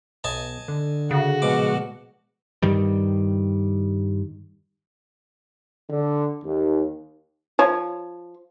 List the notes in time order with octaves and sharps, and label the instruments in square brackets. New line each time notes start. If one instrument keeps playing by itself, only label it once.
[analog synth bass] B1 [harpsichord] D#5 G#5 A5
[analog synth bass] D3
[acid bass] C#3 [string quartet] F#4
[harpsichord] A#1 B2 D6 [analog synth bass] G#3
[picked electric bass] G2 D#3 G3
[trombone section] D3
D#2
[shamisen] F3 C#5